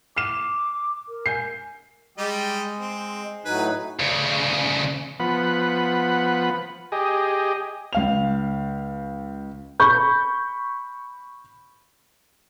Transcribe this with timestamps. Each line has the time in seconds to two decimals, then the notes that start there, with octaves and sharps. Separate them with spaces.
0.17 D6 F6 C7 E7
1.09 A#4
1.26 G#5 G6 C7
2.18 G3 G#3 G4 D#5
2.79 C4
3.45 A2 F#3 D#4 B4 G#5
3.99 D2 C#3
5.20 F3 B3 F#5 B5
6.92 G4 G#4 D#5
7.93 C#2 F5 F7
9.80 B5 C#6 G6